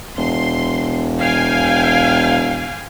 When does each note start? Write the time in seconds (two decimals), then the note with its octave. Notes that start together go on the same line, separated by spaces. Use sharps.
0.18 E1 C6
1.19 F5 G5 G#5